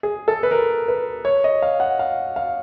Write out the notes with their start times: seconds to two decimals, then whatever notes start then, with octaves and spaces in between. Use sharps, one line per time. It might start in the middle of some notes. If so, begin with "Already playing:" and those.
0.03 G#4
0.28 A4
0.43 B4
0.51 A#4
0.88 B4
1.25 C#5
1.44 D#5
1.62 F5
1.80 F#5
1.99 F5
2.36 F5